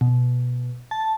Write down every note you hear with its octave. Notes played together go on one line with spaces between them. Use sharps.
B2
A5